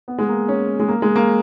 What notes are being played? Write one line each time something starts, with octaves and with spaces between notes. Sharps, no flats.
B3
G#3
A#3
C#4
G#3
A#3
G#3
A#3